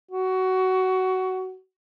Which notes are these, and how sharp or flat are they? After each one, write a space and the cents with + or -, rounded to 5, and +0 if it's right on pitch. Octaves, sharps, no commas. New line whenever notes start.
F#4 +15